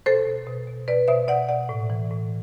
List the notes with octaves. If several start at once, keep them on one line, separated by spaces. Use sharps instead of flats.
B2 A4 C5
B2
B2
B2
B2 B4 D5
B2 C5 E5
B2 D5 F#5
B2 D5 F#5
A2
E3
A2